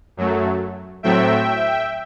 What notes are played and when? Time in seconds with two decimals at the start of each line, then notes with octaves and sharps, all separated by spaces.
0.17 F#2 F#3 A3
1.03 A2 F#3 A3 C4 E5 G5